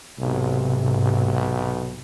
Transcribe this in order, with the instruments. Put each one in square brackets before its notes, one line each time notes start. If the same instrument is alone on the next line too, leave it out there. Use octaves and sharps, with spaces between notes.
[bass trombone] B1 [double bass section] G#2 C3